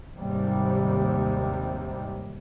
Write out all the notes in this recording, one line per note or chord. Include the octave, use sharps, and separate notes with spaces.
D#2 G#2 C3 G3